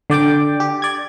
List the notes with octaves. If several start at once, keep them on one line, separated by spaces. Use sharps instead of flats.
D3 D5 G5 D6
G4
D5 G#6